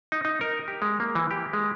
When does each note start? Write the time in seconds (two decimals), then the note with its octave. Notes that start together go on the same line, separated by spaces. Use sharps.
0.12 D#4
0.25 D#4
0.41 A#4
0.68 G4
0.82 G#3
1.00 A#3
1.15 E3
1.31 G4
1.53 G#3